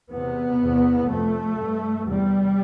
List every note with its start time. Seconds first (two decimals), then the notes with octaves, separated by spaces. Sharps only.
0.10 E2 C3 B3
0.59 E2 C3
1.08 F2 C3 A3
1.56 G2
2.05 E2 C3 G3